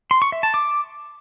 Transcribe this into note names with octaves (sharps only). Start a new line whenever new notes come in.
C6
C#6
E5
A5
D6